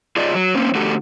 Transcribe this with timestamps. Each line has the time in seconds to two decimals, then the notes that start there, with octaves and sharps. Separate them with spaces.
0.17 F4 G#4 D5 D#5
0.35 F#3
0.55 A#3 C4 C#4
0.75 D3 A3 F#4 G4 A4